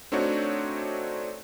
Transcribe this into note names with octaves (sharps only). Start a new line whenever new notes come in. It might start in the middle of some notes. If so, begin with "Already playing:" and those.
A3 C4 D4 D#4 F#4 C#5